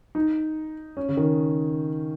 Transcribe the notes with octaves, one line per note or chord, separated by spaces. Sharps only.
D#4
C#4
C#3
D#3